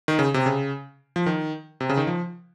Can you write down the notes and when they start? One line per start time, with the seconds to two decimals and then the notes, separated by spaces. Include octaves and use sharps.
0.08 D#3
0.19 C#3
0.34 C3
0.46 C#3
1.16 F3
1.26 D#3
1.80 C3
1.89 C#3
1.97 D#3
2.07 F3